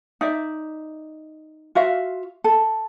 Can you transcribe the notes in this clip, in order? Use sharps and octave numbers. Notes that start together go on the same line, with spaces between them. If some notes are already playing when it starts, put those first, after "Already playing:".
D#4 D5 E5
F4 F#4 E5 F5
A4